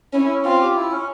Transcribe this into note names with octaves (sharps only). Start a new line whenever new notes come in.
C#4 E4
E4
C#4
C4 F4
G4
E4
C#4